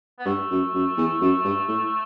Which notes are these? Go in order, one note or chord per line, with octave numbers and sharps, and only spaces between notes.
B3
G2 A3
F#2
F#2
E2
F#2
G2
A2